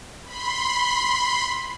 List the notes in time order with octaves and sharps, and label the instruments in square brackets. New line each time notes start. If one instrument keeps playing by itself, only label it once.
[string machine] B5 C6